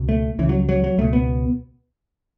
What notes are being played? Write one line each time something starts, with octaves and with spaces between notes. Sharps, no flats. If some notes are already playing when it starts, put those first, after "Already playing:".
Already playing: C#2 B2
A3
C#2 C#3 E3
F#3
F#3
F#3
C#2 B2 A3
B3